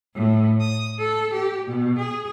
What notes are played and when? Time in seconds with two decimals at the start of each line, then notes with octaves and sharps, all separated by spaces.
0.13 A2
0.61 D#6
0.99 A4
1.33 G4
1.66 B2
1.97 G#4